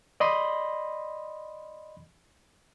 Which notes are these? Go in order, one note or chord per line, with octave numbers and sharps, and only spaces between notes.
D5 D#5 B5 C6